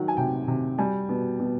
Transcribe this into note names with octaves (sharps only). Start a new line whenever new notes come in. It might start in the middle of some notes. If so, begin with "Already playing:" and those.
Already playing: D#3 F#3 F#5
G#5
C3 G5
C3
G3 G#5
B2
B2